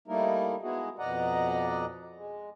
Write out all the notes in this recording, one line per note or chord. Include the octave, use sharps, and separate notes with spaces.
G3 A3 A#3 D#4 E4 A#4
G#3 B3 D#4 E4 F#4 G#4
F2 B2 D5 D#5 F#5 A#5
G#3